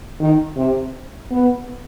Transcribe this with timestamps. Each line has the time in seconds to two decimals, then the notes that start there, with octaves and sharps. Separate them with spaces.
0.20 D#3
0.56 C3
1.31 B3